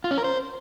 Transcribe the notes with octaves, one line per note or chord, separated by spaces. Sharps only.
F4
C#4
A#4
C5